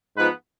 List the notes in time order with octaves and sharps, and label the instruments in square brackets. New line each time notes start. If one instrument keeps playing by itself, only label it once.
[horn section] G#2 F3 B3 B4